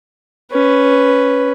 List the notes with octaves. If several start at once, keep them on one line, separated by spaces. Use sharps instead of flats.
C#4 B4